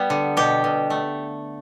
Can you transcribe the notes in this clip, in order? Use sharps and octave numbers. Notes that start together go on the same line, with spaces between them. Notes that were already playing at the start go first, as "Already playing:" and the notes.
Already playing: G3 B3
D3
B2 G4
B2
A3